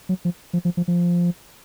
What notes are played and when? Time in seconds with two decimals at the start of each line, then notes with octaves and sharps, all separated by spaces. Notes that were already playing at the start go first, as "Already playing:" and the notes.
0.09 F#3
0.25 F3
0.53 F3
0.65 F3
0.77 F3
0.88 F3